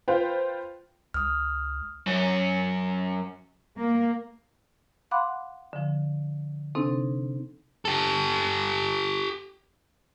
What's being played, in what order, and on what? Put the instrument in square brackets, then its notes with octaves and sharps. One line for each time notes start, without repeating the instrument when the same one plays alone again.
[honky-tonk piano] F4 B4 C5 F5 G5
[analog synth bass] C#2 [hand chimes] D#6 F6
[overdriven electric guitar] F#2 C#4
[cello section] A#3
[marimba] F5 F#5 B5 C6 D6 F#6
D3 F3
C3 C4 D4 D#4 A4
[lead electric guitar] G4 A4